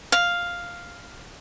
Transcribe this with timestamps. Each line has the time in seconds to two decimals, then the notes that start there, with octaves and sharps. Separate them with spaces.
0.12 F5